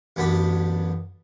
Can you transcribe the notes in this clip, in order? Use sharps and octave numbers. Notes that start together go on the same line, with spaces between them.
A1 F#2 B3 D4 B5